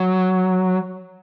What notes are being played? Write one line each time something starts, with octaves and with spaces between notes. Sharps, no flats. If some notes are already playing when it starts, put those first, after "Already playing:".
Already playing: F#3